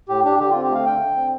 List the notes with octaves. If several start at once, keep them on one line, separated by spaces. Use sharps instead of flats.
A2 G4
D4 G4
D3 G4
C4 F4
G4
A3 F5
D3 G5
D3
C4